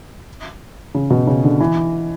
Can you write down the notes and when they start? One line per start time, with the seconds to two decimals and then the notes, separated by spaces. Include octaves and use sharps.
0.95 C#3
1.10 B2
1.27 C#3
1.44 D3
1.60 E3